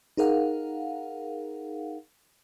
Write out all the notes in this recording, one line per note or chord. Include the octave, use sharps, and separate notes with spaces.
D#4 G#4 A#4 F5 F#5